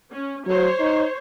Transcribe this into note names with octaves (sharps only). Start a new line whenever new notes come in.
C#4
F#3 C5 C#5
D#4